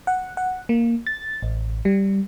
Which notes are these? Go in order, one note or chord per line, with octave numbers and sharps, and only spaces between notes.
F#5
F#5
A#3
A6
A1
G3